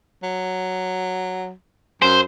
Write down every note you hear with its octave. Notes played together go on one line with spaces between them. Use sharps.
F#3
F#2 C5